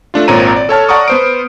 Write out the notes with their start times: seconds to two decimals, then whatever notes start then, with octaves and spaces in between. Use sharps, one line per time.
0.14 A3 D4 F4
0.28 G#1 A#2 C4 C#5 A#5 D#7
0.56 D5
0.69 A4 C#5 A5 F6
0.89 D5 F#5 A5 A#5 C#6 D#6
1.08 B3 C5 D7